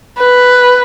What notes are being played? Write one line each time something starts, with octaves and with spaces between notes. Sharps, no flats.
B4